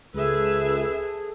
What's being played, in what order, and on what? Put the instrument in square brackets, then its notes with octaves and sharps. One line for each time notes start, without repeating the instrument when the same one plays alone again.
[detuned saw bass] C#2 [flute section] G#4 E6 [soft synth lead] A4 [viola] B4 E5